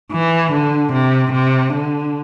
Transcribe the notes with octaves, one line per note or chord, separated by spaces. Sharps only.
E3
D3
C3
C3
D3